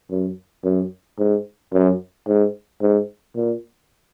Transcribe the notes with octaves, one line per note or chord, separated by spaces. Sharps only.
F#2
F#2
G#2
F#2
G#2
G#2
A#2